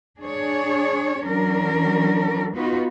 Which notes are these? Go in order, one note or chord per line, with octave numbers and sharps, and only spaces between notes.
D4 G#4 C#5
E3 F#3 C#4 D4 A#4
B3 D#4 F4 F#4 B4